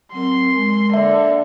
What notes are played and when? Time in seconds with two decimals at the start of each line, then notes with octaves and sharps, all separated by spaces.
0.12 F#3 C4 A#4 C6
0.52 G#3 A#4
0.94 D3 A#3 E5